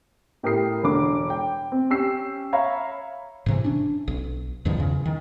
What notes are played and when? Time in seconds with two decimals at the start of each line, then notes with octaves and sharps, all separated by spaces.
0.43 A2 G4 A#4 D#6 C7
0.83 E1 D3 D6
1.30 G5
1.72 C4
1.90 C#4 G4 E6 C7
2.53 C#5 E5 F5 A#5 B5
3.46 G#2 C3 E3
3.64 C#4 D4
4.08 B1
4.65 E2 G2 D#3 F3
4.78 E2 C#3
5.06 D#3